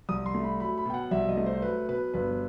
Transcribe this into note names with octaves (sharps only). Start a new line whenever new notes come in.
C2 D#6
C6
A3
B5
F#3 B5
B5
B2 G5
F#5
C2 E5
D#5
A3
C5
F#3 B4
B2 B4
G1 B4